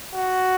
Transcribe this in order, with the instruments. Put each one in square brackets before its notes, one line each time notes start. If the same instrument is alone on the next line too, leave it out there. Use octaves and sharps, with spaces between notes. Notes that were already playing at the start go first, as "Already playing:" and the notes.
[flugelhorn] F#4